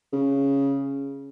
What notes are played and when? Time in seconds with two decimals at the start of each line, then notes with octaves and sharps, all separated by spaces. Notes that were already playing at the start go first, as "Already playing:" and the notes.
0.13 C#3